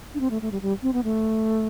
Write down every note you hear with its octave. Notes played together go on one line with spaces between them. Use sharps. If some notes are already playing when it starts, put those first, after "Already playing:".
D4
C4
A3
A3
G3
G3
C4
B3
A3